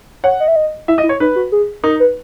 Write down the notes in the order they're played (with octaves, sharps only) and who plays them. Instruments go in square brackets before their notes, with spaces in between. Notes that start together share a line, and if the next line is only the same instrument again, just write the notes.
[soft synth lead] C#5 [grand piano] F#5
[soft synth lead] D#5
E5
D#5
[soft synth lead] E4 [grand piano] E5
[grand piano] D#5
[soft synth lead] E4
[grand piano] C#5
[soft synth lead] D#4 [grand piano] B4
[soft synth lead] F#4
G#4
[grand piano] D#4 [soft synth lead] A#4
[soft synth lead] B4